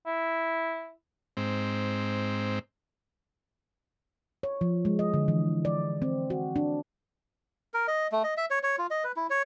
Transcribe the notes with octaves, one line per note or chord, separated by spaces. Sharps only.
E4
G#2 C4
C#5
F3
G#3
D#5
D3
E3
D5
C4
F#4
D4
A#4
D#5
A3
D#5
E5
C#5
C#5
F4
D#5
B4
E4
C#5